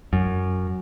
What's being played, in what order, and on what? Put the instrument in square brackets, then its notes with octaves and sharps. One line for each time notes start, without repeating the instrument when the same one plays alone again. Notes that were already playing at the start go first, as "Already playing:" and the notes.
[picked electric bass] F#2